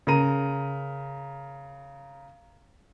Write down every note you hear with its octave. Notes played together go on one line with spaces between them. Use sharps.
C#3 A#4 A#5 D#7